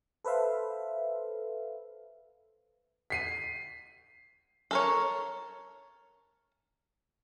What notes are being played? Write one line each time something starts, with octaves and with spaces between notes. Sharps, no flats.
A4 B4 C5 E5 F5
B6 C7 D#7
A4 A#4 C#5